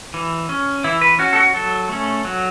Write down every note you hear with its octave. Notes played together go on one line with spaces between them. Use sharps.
E3
C#4
E3 E4
B4
C#4 F#4
A4
F#4
F#3 A4
A3 C#4
F#3